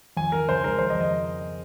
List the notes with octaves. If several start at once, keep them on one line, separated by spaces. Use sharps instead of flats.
F2 G#5
F2 A#4
C#3 C5
G#3 A#4
F2 C5
D#5
F2
D#5